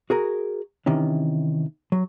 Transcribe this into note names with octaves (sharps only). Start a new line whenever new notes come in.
F#4 G#4 A#4
C3 D#3 E3 C#4
F#3